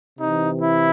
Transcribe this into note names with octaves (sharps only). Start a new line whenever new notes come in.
C3 E3 D#4
E4